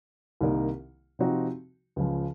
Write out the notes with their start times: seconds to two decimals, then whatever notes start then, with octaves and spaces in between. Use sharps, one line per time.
0.41 C2 C3 D#3 A#3 D#4
1.19 C3 F3 C4 D#4 F#4
1.96 C#2 C#3 F3